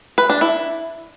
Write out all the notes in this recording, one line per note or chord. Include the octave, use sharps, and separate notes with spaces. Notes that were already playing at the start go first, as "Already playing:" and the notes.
B4
D4
E4